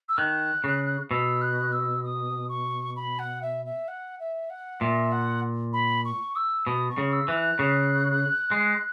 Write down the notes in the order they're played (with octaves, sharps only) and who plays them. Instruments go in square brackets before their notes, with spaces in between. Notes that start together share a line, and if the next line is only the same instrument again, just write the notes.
[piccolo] E6
[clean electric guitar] D#3 [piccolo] F#6
[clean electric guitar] C#3
[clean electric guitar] B2 [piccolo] E6
[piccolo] F#6
E6
D#6
C#6
B5
F#5
E5
E5
F#5
E5
F#5
[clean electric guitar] A#2 [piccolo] E5
[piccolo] F#5
B5
C#6
E6
[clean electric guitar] B2 [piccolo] D#6
[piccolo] C#6
[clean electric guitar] C#3
[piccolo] E6
[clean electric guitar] E3
[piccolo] F#6
[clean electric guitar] C#3
G#3